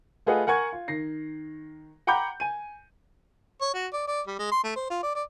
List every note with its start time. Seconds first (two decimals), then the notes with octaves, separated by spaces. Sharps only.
0.26 A3 F4 G#4 B4 D#5 F#5
0.47 A#4 F#5 G#5 C#6 G#6
0.73 F4
0.88 D#3 A#6 C7
2.07 F#5 G5 A#5 B5 D6 G6
2.40 G#5 D#7
3.61 C#5
3.74 F#4
3.93 D5
4.08 D5
4.27 G3
4.39 G#3
4.52 C6
4.64 A3
4.76 C5
4.90 F4
5.03 D5
5.15 D5